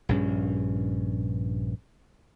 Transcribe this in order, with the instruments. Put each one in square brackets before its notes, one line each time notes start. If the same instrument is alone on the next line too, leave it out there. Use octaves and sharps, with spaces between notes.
[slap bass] A#1 G2 C#4